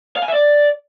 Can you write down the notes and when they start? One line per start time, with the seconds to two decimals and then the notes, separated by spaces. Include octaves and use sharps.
0.16 F5
0.22 G#5
0.28 E5
0.34 D5